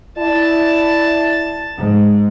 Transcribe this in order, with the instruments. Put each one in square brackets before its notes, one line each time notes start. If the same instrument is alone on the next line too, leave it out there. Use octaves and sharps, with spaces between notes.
[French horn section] E4 D5 [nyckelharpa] A5
[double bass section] G#2